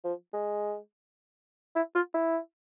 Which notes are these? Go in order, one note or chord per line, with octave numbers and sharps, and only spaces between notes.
F3
G#3
E4
F4
E4